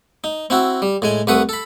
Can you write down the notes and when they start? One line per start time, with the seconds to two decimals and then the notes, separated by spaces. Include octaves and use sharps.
0.24 D#4
0.50 C4 E4 F#4
0.82 G3
1.02 A2 G#3 G#5
1.27 C2 A3 B4 F#5 D#6
1.49 A4 B5